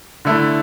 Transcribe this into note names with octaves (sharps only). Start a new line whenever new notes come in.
D3 A3 E4